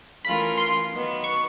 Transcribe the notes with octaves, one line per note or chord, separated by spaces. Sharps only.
E3 A3 C#4 F4 A#4 B5
C6
D#3 F#3 B3
C#6